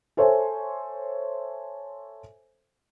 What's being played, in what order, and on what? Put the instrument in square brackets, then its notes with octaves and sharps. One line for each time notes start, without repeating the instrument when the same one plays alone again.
[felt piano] A4 C5 C#5 E5 G#5